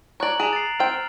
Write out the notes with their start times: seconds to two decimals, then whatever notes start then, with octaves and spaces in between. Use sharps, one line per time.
0.20 C#5 D5 A#5 F#6 F#7
0.40 G#4 D5 D7 E7 F7
0.53 A6 C7
0.80 C4 G5 F6